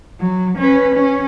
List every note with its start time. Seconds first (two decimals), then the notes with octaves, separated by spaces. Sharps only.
0.21 F#3
0.58 C#4 B4
0.95 C#4